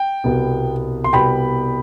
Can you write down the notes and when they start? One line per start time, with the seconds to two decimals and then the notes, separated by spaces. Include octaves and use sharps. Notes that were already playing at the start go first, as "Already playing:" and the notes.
Already playing: G5
0.24 C2 B2 G3 B3
1.04 C6
1.13 C2 B2 G3 B3 G5 B5